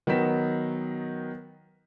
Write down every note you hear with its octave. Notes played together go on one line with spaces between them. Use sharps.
D#3 F#3 B3 D#4 B6 E7